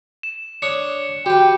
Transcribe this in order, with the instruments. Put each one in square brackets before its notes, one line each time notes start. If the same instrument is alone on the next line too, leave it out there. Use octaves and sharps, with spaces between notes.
[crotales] E7
[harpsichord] D4 C#5 D#6 [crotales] C#7
[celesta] F#4 [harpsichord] G4 B4 [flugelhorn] G5